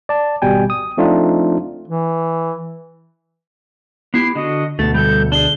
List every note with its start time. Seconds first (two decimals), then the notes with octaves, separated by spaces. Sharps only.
0.09 D5 A5
0.42 G#1 B2 G3 G5 G#5
0.70 D#6
0.97 F3 A3 C4 D4 D#4 F4
1.88 E3
4.14 B3 E4 G4 C7
4.35 D3 F#4 D#5
4.79 D2 B2 A3 A6
4.94 G3 A4 G6
5.32 D4 G#4 G7